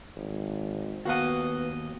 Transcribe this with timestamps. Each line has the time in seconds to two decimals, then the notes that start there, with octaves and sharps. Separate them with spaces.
0.16 G#1
1.05 D#2 B3 F#4 D#5 F5 F#5